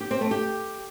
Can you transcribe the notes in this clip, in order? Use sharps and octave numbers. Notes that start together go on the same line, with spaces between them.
G4
C4
A3
G4